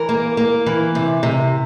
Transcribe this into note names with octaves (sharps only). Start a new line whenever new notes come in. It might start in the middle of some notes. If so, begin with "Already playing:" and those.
Already playing: E3 A#4
A#3
A#3
E3
C3
C3